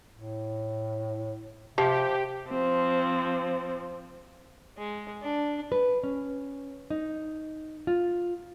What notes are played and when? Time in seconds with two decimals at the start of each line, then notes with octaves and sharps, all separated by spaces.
0.16 A2
1.78 C3 F3 G4
2.49 F3 C4
4.78 G#3
5.22 D4
5.72 B4
6.04 C#4
6.90 D#4
7.87 F4